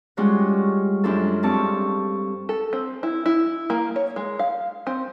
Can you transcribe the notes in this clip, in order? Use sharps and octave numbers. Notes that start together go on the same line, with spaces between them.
G3 G#3 C#4 F4 F#4 C#5
F#2 G#3 D4 F4 A4
G2 C4 A5 C#6 E6
A4
C4
E4
E4
A#3
C#5
G#3
F5
C4